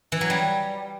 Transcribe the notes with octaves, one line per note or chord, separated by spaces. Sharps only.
E3
F#3
G3